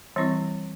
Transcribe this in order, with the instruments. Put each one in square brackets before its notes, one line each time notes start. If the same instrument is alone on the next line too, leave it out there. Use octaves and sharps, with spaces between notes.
[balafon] E3 G3 C4 E4